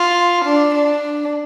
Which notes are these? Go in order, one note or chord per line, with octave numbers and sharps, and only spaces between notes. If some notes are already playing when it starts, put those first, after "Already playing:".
Already playing: F4
D4
D4